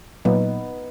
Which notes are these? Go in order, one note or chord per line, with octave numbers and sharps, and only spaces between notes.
A#2 F#3 A#3 B3 D#4